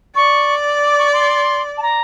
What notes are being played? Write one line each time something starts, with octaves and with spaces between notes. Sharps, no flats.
D5 C#6
D6
C#6
C6
A5
A#5